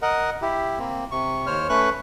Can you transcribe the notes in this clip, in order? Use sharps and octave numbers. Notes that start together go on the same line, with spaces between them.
A#4 D#5 F#5
E4 G4
A#3 C4
C3 C#6
D#2 C5 C#5 F6
A3 C#4 B4 C#6 F#6